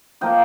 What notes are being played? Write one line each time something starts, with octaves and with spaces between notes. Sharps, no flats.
F3 A#3 D#5 G5